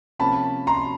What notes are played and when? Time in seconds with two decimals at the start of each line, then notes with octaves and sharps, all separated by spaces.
0.19 C3 F3 A#3 C#4 A5 B5
0.67 A#5 C6